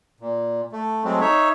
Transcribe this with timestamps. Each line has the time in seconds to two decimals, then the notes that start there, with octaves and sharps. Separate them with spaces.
0.20 A#2
0.72 A3
1.04 F#3 G#3 A3 C4
1.21 D#4 C#5 E5